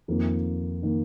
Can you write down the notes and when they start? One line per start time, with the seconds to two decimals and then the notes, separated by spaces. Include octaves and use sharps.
0.08 F2 D#3 A#3
0.83 D#3 A#3